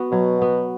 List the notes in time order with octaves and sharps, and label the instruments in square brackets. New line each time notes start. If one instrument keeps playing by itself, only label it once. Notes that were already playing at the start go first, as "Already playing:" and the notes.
Already playing: [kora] B3 F#4
[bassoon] B2 [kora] F#3
[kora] B3 F#4